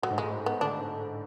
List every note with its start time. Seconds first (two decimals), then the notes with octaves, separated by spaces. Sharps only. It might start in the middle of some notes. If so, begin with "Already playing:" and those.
0.03 A2 F#3
0.10 G#2
0.18 A2 G#3
0.46 B3
0.61 D3 D4